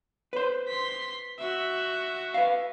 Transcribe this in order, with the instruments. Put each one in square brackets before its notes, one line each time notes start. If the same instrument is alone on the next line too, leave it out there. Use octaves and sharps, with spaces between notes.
[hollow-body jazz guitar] B4 C5
[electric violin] C6 B6
F#4 E5
[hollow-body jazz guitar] B4 F5